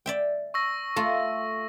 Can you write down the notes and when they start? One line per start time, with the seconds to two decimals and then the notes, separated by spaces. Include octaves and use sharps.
0.06 D5 E5 G5
0.54 C#6 E6 A#6
0.96 A3 F4